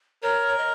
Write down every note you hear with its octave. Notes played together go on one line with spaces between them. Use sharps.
A#4 C#5
D#5